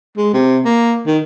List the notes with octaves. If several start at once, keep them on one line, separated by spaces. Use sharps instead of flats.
G#3
C3
A#3
D#3